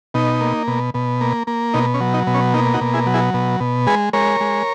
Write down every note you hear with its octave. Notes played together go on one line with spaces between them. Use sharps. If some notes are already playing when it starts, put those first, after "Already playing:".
B2 D#4
A#3
B2
B2
A#3
A#3
B2 D#4
C#4
F#3
D#4
B2
C#4
A#3 D#4
D#4 F#4
B2
E4 G#4
F#3
E4 G#4
B2
B2
G#3 G#4 B4
G#3 A#4 C#5
G#3